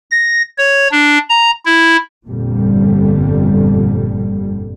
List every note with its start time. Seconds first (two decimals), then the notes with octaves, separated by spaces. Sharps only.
0.11 A#6
0.58 C#5
0.91 D4
1.29 A#5
1.65 E4
2.28 G1 F2 A#2 D3 G3